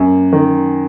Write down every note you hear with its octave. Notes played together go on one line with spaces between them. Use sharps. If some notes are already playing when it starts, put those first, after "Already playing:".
Already playing: F#2 A#3
D#3